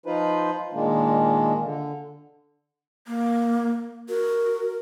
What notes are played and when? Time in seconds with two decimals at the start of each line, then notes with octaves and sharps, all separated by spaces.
0.06 F3 D#4 F4 B4 C5
0.73 A#2 D#3 G#3 A#3 D4
1.63 D3
3.07 A#3
4.09 F#4 A#4